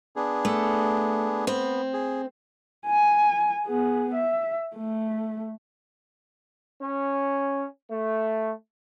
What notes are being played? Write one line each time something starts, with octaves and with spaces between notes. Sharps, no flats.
B3 D4 G#4
A3
B3 C4
G#4
G#5
B3 G#4
E5
A3
C#4
A3